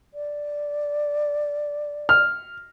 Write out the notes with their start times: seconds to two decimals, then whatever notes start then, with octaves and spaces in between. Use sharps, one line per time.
0.14 D5
2.09 F6